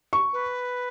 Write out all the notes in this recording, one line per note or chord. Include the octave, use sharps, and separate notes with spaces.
C#6
B4